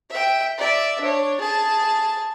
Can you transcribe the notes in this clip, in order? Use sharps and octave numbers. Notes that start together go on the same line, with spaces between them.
E5 G5
D5 E5
D4 C#5
G#4 A5